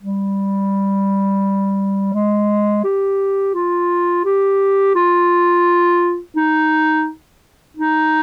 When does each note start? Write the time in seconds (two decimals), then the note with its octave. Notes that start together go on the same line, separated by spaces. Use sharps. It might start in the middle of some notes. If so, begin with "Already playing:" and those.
0.03 G3
2.14 G#3
2.84 G4
3.54 F4
4.25 G4
4.95 F4
6.36 D#4
7.77 D#4